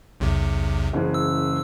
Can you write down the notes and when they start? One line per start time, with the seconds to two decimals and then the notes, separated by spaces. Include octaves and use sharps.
0.20 B1 E2 C3
0.93 F#1 C#3 E3
1.14 E6